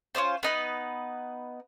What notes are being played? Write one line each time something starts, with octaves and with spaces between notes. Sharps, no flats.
C#4 D#4 F4 C5
B3 D#4 B4